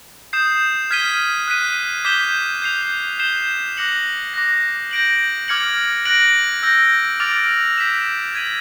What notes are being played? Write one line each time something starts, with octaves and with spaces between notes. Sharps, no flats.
D#6 G6 C7 E7
F6 G#6 B6 D#7 G7
F#6 B6 D#7
D6 G6 B6 E7 G7
G6 C7 F7
G6 C7 E7 G7
D6 F#6 A#6 C#7 F#7
D6 F#6 A#6
G6 A#6 D7 F#7
D6 F6 G#6 C#7 F#7
F#6 A#6 D7 F#7
E6 G6 A#6
D6 F6 A6 D7 F7
G6 B6 E7
G#6 B6 D#7 F#7